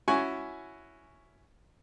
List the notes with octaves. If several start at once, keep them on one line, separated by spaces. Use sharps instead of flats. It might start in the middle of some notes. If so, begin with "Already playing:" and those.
C#4 E4 F#4 G#5 C#6